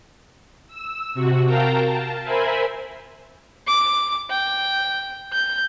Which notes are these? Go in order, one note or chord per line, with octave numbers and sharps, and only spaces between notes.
E6
C3 F#4
A#4 F5 G5 A5 A#5
A5
A#4 C5 E5 G#5 B5
D6
G5
G6